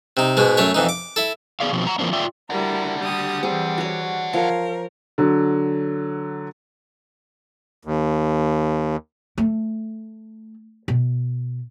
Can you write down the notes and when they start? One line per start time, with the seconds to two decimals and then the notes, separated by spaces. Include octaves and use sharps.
0.17 C3 D#4
0.37 G#2 B2 G#3
0.57 F#2 A3 C#5
0.74 F2 E3 D#4
0.89 D6
1.16 E4 A4
1.60 B3 G#4 D5 F5
1.73 B2 F3 C4
1.87 F#5 A#5
1.99 E3 F3 A#3 C4 D4
2.13 F4 D5 E5 G5
2.50 G3 D4 E4 F#4 A#4
2.99 G3 G4 D#6
3.43 E3 G3 C4 G#4 D5 F#5
3.78 F#4 C#5
4.33 F3 A#4 C#5 F5
5.18 D3 F#3
7.85 D#2
9.38 A3
10.88 B2